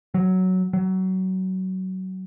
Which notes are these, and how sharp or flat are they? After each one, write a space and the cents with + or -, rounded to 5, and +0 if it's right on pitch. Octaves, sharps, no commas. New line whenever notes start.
F#3 +5
F#3 +20